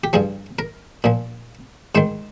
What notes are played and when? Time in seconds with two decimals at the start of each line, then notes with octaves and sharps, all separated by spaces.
0.04 G4
0.13 G2 F3 G#4
0.59 A#4
1.04 A#2 F3
1.95 G#2 D#3 C5